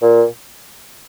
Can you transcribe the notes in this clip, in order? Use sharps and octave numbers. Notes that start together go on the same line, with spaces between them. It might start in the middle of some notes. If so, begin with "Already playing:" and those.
A#2